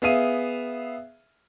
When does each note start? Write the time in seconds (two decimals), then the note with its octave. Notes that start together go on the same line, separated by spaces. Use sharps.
0.02 B3 G#4 E5 F5 D#7